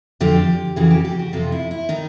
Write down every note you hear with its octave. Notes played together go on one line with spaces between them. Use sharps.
F2 D3 F3 G4
F2 C#3 E3 F#4
G4
G4
F#4
F2 C3 F3 F4
E4
E4
D#3 D#4